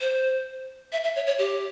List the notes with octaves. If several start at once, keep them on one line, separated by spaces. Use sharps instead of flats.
C5
E5
E5
C#5
C#5
G4